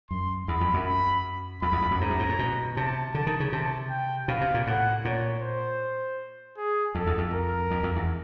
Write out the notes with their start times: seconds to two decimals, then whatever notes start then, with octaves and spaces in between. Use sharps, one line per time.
0.10 F#2 C6
0.48 E2 B5
0.61 F2
0.74 F#2
0.86 B5
1.62 F2 B5
1.72 E2
1.82 F2
1.91 F#2
2.01 G#2 A#5
2.10 F#2
2.19 G#2
2.29 A2
2.39 B2
2.77 C3 A5
3.14 D3 A5
3.27 D#3
3.40 C#3
3.52 C3 A5
3.90 G5
4.28 B2 F5
4.41 C3
4.54 A#2
4.67 A2 F#5
5.05 A#2 C#5
5.42 C5
6.57 G#4
6.95 F2 A4
7.07 E2
7.18 F2
7.33 A#4
7.71 F2
7.83 F2
7.96 E2